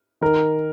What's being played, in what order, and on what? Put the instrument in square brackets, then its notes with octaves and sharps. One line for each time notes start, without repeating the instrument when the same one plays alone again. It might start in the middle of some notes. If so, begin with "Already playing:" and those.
[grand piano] D#3 A#4